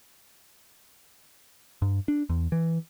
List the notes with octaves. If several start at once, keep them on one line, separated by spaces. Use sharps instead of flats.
G2
D4
E2
E3